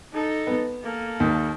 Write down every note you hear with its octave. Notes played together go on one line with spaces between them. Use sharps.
D#4 A4
B3
A#3 A4
D#2